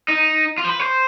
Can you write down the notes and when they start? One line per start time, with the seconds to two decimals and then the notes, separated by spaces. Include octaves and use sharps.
0.08 D#4
0.58 F4
0.65 C5
0.69 B4
0.79 C5